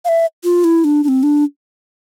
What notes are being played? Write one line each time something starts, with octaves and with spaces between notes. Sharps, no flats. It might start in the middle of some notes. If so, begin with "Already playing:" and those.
F5
E5
F4
E4
D4
D4
C4
D4